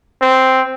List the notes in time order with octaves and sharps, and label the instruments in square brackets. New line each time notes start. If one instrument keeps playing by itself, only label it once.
[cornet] C4